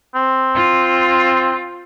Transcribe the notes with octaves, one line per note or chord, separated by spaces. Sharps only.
C4
F4